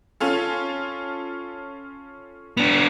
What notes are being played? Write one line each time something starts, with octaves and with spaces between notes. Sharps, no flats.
C#4 F4 A4
B3 D4 F7